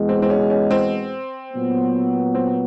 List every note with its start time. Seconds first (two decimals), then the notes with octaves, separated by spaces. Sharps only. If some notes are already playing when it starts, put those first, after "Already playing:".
Already playing: E2 B2 G#3
0.09 C4
0.22 C4
0.30 C#4
0.50 C#4
0.71 C4
1.53 A#2 F#3 B3
2.35 C4